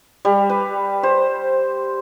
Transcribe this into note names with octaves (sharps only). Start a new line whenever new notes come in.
G3
B4
C5